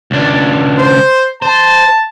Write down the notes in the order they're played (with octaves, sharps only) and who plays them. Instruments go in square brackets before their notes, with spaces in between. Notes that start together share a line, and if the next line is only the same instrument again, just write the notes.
[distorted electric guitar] C#2 D4
[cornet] C5
[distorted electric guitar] C5 [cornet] A5